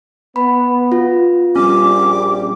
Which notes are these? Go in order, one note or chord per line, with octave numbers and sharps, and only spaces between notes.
B3 B5
F4
A#1 G3 C#4 D6